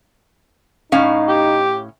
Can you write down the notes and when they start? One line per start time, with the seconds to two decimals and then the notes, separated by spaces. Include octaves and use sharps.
0.92 A2 C#4 D#4 F5
1.28 G4